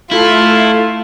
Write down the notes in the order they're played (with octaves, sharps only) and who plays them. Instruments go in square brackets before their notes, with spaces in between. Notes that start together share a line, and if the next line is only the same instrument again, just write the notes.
[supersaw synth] A3 [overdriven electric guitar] E4 [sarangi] F4